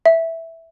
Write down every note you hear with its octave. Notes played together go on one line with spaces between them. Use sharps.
E5